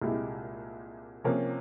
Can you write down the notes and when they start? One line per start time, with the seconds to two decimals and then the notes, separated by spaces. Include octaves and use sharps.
0.02 C2 A#2 G#3 E4 G4
1.24 C3 F3 A#3 C#4